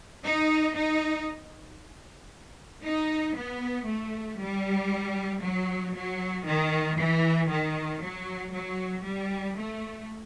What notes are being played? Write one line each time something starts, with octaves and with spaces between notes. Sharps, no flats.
D#4
D#4
D#4
B3
A3
G3
F#3
F#3
D#3
E3
D#3
F#3
F#3
G3
A3